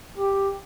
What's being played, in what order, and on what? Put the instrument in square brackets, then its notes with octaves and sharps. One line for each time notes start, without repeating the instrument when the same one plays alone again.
[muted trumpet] G4